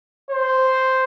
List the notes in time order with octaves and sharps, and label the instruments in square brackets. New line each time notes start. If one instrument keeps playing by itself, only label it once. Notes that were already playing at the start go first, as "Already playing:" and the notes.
[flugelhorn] C5